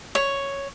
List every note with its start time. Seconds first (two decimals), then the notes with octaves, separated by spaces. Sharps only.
0.15 C#5